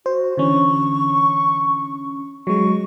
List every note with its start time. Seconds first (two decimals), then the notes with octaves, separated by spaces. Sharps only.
0.06 F#4 C5
0.37 D3 E3 C#4 C#6
2.47 F#3 G#3 C#6